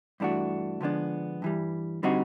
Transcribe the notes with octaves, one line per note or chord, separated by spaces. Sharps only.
G2 E3 A3 D4 F#4
D3 F3 G#3 B3 D4
G2 E3 G3
D3 G3 C4 D#4 F#4